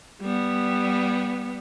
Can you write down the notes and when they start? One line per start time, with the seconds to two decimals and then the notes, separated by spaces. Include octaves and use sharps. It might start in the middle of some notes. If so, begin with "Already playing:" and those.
0.21 G3 B3